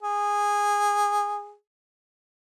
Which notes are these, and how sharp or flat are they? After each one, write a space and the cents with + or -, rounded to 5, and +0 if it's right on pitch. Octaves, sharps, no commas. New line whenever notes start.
G#4 -15